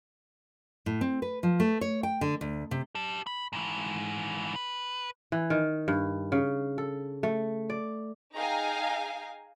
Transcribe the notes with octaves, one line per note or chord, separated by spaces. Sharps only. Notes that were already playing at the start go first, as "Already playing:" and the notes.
A2
C4
B4
F3
A3
C#5
G5
D3
D2
C3
G4 A5
B5
G#2 E3
B4
E3
D#3
G2
C#3
A4
A3
D5
D#4 G#4 F5 G5 G#5 A#5